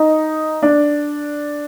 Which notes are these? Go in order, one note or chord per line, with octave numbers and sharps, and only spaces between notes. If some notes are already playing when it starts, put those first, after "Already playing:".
Already playing: D#4
D4